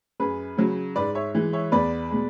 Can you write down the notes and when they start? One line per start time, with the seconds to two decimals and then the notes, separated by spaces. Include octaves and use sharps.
0.20 F#2 G#4 B4
0.57 C#3 F#3
0.96 G#2 B4 D5
1.15 C#5 E5
1.35 E3 G#3
1.53 C#5 E5
1.72 E2 B4 D5
2.11 B2 G#3